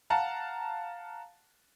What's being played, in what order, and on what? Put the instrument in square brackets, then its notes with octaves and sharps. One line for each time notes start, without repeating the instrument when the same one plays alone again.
[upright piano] F5 F#5 A5 A#5